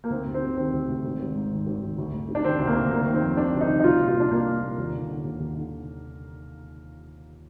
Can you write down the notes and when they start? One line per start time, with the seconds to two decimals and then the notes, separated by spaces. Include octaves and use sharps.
0.04 A#3
0.10 D2 C4
0.27 D2
0.34 C4
0.42 C3
0.57 D#3 C4
0.73 D2
0.89 D2
1.05 G#1
1.20 G#1
1.35 G#2
1.51 D#3
1.67 G#1
1.82 G#1
1.98 D2
2.14 D2
2.28 C3
2.35 D4
2.44 D#3 C4
2.59 D2
2.67 A#3
2.75 D2
2.91 G1 A#3
3.07 D#3
3.14 C4
3.22 F2
3.37 C3 D4
3.54 G1
3.61 D#4
3.68 D#3
3.80 D#4
3.84 C2 F4
3.99 A#2
4.08 F4
4.15 A#2 D4
4.31 C2 A#3
4.47 C2
4.63 A#2
4.78 D#2
4.93 D3
5.09 D3
5.24 D#2
5.40 D#2
5.56 D3